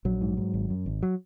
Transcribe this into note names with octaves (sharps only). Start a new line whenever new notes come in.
A#1 F#3
G#2
G#2
G#1
F#2
G#1
F#3